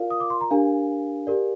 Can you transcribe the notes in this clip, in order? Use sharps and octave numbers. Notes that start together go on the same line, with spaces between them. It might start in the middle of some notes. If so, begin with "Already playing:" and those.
Already playing: F4 A#4 D5 F5
D#6
D6
C6
A#5
D4 G4 A#4 F5 G#5
G4 A#4 D5